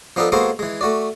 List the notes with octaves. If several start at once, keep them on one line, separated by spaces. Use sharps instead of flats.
F3 B3 D4 D#4 A4
G#3 A#3 B3 F#4 A4 C5
E3 G#3
A3 F#4 D5